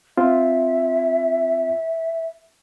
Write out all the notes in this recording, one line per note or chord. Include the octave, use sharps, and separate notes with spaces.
C4 F4 E5